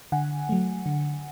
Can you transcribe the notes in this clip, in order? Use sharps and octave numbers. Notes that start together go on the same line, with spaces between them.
D3 F#5 G#5
F#3 A3
D3